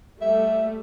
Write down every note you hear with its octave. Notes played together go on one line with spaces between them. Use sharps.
G3 A3 E5